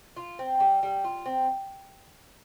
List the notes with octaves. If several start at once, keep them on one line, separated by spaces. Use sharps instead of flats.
F4
C4
G3
G3
F4
C4